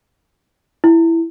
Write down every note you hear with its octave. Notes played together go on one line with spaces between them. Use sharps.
E4